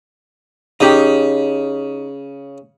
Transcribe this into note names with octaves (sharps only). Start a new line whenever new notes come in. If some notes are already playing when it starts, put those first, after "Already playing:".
C#3 D#4 G4